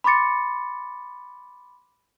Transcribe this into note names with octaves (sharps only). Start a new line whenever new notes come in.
B5 C6 D6 A6 C#7